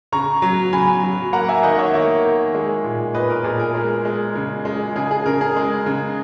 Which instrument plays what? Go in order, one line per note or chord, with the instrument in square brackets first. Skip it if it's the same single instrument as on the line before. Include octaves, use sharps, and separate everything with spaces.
[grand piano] C#3 A#5 C#6
F#3
C#3 G#5 B5
F#3
A#3 F#5 A#5
E5 G#5
D#3 D#5 F#5
C#5 E5
A#3 C#5 E5
D#3
G#3
A#2
A#2 B4 D#5
A#4
A#2 G#4
A#4
G#3
G#3
C#3
G#3
C#3 G#4
G#4
C#3 A#4
G#4
G#3
C#3